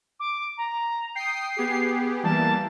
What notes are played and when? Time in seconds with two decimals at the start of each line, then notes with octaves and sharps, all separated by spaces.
0.19 D6
0.57 A#5
1.15 G5 D#6 C7
1.56 B3 G4 G#4
2.23 E3 G3 A#3 A5